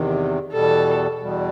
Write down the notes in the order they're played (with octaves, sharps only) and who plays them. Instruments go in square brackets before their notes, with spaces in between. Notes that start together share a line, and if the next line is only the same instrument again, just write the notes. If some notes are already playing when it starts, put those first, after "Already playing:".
Already playing: [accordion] E2 C3 D#3
[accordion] E2 B2 G3 [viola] A4
[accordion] E2 B2 G3